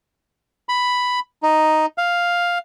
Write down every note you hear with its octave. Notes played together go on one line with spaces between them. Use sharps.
B5
D#4
F5